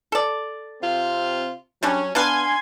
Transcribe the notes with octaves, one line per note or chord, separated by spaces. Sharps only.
A4 D5
C3 C4 F4
F#3 G3 C#4 D4 G#5
B3 D4 B4 F5 G#5 C6 G#6